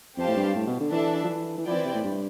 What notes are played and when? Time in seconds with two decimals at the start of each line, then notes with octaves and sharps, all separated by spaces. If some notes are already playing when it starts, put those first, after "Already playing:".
0.17 F2 C4 G4 C5 F5 A5
0.28 A2
0.36 G2
0.55 A2
0.67 B2
0.80 D3
0.92 E3 D4 A4 E5
1.24 F3
1.28 E3
1.57 E3
1.66 F3 C4 E4 B4 D5 G5
1.75 E3
1.85 C3
1.95 A2
2.04 G2